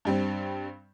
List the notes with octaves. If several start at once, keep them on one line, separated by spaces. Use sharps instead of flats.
G2 G3 C4